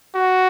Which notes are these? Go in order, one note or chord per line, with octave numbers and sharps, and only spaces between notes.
F#4